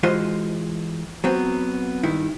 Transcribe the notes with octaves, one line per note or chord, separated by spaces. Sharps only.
E3 G#3 F4 F#4 C5 D#5
F#3 B3 C4
G2 D#3 E4